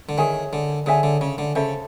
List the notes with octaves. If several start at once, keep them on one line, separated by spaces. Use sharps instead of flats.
D3
D#3 G#4 C#5 E5 G#5
D3
D3 G#4 C#5 E5 G#5
D3
C#3
D3
C#3 A4 C5 E5